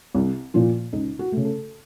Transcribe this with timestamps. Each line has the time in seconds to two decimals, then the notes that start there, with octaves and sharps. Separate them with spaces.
0.15 C2
0.54 A#2 F3 F4
0.93 C#2 D#4
1.19 F#4
1.32 C#3 A3
1.45 A4